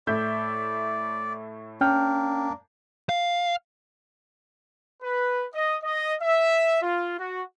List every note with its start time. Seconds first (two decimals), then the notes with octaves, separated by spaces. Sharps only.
0.07 A2 D5 E5 G6
1.81 A#3 C#4 D4 G5 F6
3.09 F5
5.02 B4
5.53 D#5
5.82 D#5
6.21 E5
6.81 F4
7.18 F#4